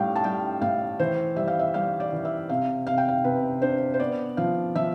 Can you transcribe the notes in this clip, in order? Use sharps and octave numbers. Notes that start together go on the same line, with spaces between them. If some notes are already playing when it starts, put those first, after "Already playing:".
Already playing: A2 G3 F5 G5
A5
G3 G5
A2 F5
E3 C5
G3 E5
F5
E5
G3 F5
D5
E3
E5
C3 F5
C3 F5
G5
F5
C3 B4
D4 C5
C5
B3 D5
F3 F5
F3 E5